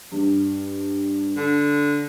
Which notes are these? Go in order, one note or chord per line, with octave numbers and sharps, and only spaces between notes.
G2
D3